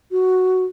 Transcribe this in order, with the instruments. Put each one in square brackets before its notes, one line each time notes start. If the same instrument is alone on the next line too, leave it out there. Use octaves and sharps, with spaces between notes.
[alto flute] F#4